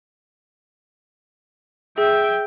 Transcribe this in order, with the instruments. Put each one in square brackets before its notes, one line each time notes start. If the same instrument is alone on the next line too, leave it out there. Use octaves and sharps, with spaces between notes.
[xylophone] G#4 [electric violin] E5 [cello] G5